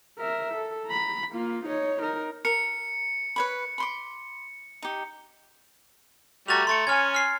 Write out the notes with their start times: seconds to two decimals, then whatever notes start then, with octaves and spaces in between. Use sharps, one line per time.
0.18 A#4 E5
0.54 A4
0.86 A#5 B5
1.32 A#3 F4
1.66 D#4 C#5
2.00 D#4 A#4
2.45 A#4 C#7
3.36 B4 C#5 B5
3.78 B5 C6 D6
4.83 D#4 G4
6.48 G3 A3 F#4 A#5 A6 F7
6.67 A3 C6 A6 C#7
6.87 C#4 G#5 F6 G#6
7.15 F6 C7